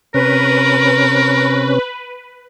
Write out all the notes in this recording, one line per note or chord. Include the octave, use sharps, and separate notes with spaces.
C3 C#4 A#4 B4